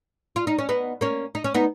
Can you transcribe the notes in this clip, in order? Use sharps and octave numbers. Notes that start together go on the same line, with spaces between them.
F4
D#4
C#4
B3 D#4
A#3 C#4
D#4
C#4
B3 D#4